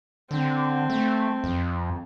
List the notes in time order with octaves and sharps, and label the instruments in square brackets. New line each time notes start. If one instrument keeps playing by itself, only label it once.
[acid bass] D3 [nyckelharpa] C4
[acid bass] A3
F2